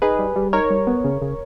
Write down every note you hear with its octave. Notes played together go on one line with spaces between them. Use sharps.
D#4 G#4 B4
G3
G3
D#4 A#4 C#5
G3
B3
C#3
C#3